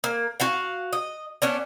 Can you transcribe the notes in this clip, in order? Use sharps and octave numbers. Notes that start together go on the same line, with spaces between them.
A#3
F#4 F5 F#5
D#5
B3 C#4 D4